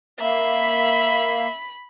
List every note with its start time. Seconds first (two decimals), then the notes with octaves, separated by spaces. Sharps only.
0.20 A#3 E5 B5